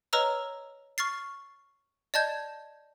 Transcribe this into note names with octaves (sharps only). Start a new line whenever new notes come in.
B4 C#5 D#5 A#5 E6 F6
C#6 F6 A6 C7
D5 D#5 A5 G6 G#6